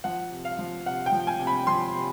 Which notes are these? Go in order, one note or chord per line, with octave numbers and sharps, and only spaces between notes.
F3 F#5
C3
F5
F3
C3 F#5
G5
F3
G#5
C3
B5
F3 C6
C3